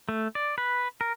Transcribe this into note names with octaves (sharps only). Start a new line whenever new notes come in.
A3
D5
B4
A#4